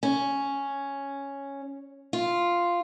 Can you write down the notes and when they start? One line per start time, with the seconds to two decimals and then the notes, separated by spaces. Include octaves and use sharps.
0.03 C#4
2.13 F4